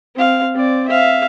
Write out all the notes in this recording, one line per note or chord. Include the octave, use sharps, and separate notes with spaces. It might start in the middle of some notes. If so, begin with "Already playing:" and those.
C4 F5
C4 D5
E5 F5